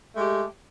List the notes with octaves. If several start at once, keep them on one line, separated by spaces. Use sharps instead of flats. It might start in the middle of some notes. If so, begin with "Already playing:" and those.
G#3 A3 G4